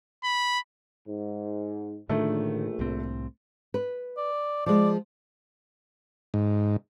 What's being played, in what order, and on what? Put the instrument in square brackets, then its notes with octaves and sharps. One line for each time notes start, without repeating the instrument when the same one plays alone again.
[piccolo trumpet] B5
[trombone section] G#2
[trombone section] A#1 [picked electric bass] A2 D3 D#3 [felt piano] A3
[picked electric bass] C2 A2 C4
[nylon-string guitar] B4
[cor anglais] D5
[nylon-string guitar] F3 G#3 [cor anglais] D5
[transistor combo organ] G#2